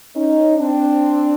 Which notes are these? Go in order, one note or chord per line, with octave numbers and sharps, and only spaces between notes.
C#4 D#4
C4 D4